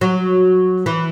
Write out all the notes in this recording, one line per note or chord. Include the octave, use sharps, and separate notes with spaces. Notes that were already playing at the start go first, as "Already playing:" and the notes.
F#3
E3